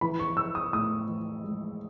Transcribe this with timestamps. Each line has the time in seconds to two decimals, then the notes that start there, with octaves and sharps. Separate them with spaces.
0.01 E3 B5
0.20 C#6
0.37 E3 E6
0.55 D#6
0.73 A2 D#6
1.08 E3
1.44 G#3